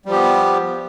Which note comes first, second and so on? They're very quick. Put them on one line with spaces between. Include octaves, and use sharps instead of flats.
G3 F3 G4 B3